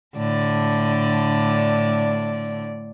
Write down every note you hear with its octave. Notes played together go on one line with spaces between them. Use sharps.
A2 D3 D5